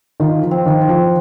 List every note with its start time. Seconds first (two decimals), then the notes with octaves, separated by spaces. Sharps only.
0.20 D#3 F4
0.43 F3
0.51 C4
0.66 D#3
0.82 C5
0.89 F3